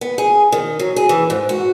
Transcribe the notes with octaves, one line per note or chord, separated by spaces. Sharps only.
B3
G#4
D#3
F#3
G#4
E3
G#2
F#4